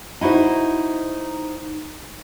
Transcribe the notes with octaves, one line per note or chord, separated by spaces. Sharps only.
D#4 E4 F#4 C5